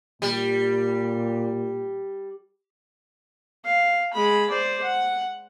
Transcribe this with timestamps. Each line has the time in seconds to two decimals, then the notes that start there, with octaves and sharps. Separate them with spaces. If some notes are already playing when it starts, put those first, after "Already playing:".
0.22 A#2 G3
3.65 F5
4.14 G#3 B5
4.50 C5 D5
4.83 F#5